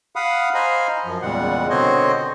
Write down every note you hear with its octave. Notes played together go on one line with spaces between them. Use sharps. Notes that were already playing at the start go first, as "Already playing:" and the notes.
F5 F#5 B5 D#6
C5 D#5 F5 G#5 A#5 B5
F#2 F3
E2 A#2 C#3 G3 G#3 F#5
B2 D3 C4 C5 C#5 D#5